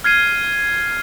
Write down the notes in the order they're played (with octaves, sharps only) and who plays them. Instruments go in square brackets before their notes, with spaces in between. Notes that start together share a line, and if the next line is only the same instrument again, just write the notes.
[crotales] F6 G#6 C7 D#7